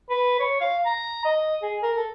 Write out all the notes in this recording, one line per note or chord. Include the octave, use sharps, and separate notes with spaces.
B4
C#5
F5
A#5
D#5
G#4
A#4
A4